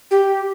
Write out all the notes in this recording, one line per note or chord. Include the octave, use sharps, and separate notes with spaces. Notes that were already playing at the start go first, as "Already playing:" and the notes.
G4